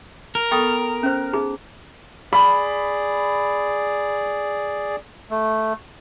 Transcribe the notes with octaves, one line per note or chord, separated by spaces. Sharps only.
A#4
B3 A4 G5 C#6 D#6
C#4 C5
D#4 G#4 A#5
G#4 D5 B5
A3